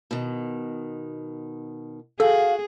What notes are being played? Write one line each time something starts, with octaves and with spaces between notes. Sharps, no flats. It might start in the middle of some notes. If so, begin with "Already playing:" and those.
B2 D#3
F#4 G#4 A4 F5